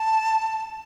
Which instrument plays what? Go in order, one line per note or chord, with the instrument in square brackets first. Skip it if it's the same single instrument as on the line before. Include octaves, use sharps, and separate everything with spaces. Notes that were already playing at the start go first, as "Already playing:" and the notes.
Already playing: [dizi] A5